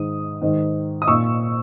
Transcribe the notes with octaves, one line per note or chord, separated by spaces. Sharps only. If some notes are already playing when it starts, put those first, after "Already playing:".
Already playing: G#2 D#3 D#6
G#2 D#3
D#6
A#2 C#6 E6